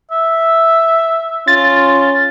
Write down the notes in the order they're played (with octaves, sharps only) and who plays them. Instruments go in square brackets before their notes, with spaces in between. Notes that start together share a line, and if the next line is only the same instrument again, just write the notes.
[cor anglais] E5
[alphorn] C#4 [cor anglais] F4 [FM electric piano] A6